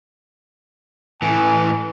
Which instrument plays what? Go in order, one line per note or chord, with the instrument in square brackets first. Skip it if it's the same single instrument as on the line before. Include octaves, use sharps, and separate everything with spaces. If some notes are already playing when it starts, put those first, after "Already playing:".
[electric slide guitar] A2 E3 [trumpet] G#5